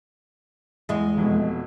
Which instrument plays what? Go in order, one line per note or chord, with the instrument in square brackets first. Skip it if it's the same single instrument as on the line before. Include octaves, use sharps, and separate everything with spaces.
[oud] E2 G#3
[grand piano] F1 B2